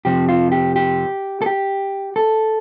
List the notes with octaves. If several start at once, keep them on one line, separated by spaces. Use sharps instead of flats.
F2 C3 F3 C4 G4
F4
G4
G4
A4
G4
A4